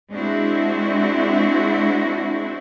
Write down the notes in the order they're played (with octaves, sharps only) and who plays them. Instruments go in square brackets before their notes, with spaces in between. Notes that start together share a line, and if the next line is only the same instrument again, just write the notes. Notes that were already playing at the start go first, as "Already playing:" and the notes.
[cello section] G#3 C4 D4 E4 F#4